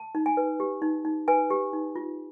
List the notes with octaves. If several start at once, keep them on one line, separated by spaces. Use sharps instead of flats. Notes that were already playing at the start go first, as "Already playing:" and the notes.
Already playing: A5
D#4
G#5
B4
G4
D#4
D#4
B4 G#5
G4
D#4
F4